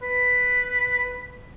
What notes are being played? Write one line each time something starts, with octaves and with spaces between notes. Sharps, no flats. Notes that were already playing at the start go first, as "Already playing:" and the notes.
B4